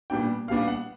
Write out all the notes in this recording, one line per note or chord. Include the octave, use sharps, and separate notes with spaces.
A#2 G3 B3 D4 G5
A#2 G3 B3 D4 F5
F#5